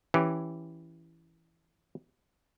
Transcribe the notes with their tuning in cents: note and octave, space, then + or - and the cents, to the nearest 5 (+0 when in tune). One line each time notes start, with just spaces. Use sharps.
E3 +0 C#4 +0 G4 +0